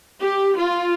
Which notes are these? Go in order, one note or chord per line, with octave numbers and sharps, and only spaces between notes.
G4
F4